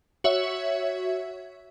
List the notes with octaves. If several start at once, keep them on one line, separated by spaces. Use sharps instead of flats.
F#4 C#5 E5